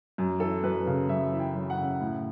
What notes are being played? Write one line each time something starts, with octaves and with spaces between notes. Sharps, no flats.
F#2
E3 A4
F#2 B4
C#3
F#2 E5
E3
G5
F#2
F#5
C#3
A2